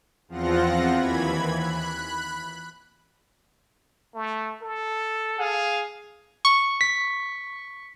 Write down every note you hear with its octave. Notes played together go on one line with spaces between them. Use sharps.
E2 F3 C4 F4 F#5 A#6
D#2 E3 B5 G#6
B5 F#6
A3
A4
G#4 F5
C#6
B6